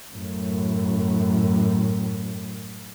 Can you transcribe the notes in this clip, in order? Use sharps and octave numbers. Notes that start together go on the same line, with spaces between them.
F#2 A2